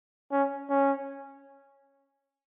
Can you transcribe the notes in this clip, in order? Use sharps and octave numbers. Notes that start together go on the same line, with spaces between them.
C#4
C#4